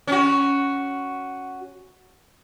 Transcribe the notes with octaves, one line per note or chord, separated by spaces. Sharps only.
C#4 F#4